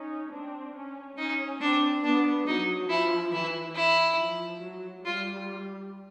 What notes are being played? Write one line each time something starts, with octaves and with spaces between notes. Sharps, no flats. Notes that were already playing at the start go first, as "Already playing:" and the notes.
Already playing: C#4 D#4
C4 D4
C#4
C#4 D#4
C4 D4
B3 D4
F#3 D#4
F3 E4
E3 E4
E4
F3
F#3
G3 F4